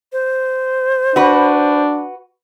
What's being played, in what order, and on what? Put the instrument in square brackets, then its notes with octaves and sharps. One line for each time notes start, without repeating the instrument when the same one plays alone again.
[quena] C5
[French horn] D4 [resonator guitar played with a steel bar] F#4 B4